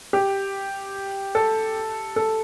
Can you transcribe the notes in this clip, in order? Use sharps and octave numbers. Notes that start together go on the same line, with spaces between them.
G4
A4
A4